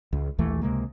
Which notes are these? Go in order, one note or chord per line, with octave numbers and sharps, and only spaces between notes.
C#2
A#1 D#2 E3 A3
C#2 C3 G#3 A#3